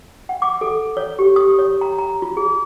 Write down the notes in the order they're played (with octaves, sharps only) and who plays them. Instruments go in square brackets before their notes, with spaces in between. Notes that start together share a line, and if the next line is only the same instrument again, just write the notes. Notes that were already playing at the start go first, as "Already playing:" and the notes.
[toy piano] F#5
D6
A4
C#5
G4
D#6
C#5
A#5
A#5
F4
G#4